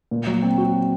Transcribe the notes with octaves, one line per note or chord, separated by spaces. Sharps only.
A#2
F#3
C4
F#4